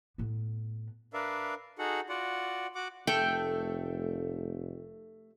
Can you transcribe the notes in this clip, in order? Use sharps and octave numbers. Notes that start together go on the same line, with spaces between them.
A2 B3
D4 A#4 B4 D5 E5 F5
D#4 F#4 G#4 A4 F#5
F4 F#4 D5 F#5
F#4 F#5 D6
F1 A3 A4 G5